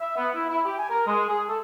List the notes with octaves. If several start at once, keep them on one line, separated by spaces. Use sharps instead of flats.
E5
B3
E4
E4
G4
G#5
A#4
G#3
G#4
A4